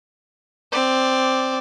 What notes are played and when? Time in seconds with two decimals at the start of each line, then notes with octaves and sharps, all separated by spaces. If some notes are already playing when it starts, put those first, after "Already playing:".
0.72 C4 D5